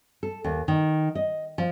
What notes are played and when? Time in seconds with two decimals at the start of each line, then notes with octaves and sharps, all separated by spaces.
0.23 A4
0.44 D#2
0.68 D#3
1.15 D#5
1.58 F3